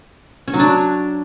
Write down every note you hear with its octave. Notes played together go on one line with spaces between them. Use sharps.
C#4
F#3
D4